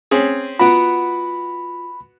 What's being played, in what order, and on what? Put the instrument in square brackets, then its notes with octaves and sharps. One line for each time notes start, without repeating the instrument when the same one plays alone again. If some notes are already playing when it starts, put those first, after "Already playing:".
[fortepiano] C4 C#4 G#4
[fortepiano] B3 F#4 [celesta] F4 D7 [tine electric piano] B5